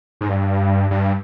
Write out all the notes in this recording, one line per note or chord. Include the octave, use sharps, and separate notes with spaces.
G#2
G2
G2